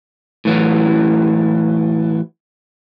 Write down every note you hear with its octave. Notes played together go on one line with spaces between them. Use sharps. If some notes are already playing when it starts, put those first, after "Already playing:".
A2 E3 F#3